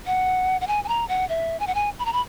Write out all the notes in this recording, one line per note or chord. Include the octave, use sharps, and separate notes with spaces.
F#5
F#5
G#5
G#5
A#5
F#5
E5
G#5
F#5
G#5
B5
A#5
B5